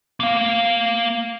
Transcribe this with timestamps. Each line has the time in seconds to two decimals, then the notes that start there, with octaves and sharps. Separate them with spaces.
0.20 A#3 F5